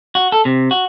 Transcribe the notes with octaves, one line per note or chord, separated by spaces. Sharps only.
F#4
A4
C3
F#4